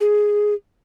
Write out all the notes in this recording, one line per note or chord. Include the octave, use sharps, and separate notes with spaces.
G#4